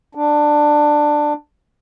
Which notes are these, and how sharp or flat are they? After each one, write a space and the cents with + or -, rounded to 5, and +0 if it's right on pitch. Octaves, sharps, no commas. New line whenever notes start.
D4 +15